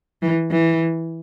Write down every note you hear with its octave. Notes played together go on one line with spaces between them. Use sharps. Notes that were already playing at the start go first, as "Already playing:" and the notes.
E3
E3